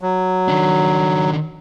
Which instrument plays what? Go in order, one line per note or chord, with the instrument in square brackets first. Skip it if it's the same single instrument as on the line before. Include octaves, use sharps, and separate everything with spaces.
[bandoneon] F#3
[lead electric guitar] D#3 D4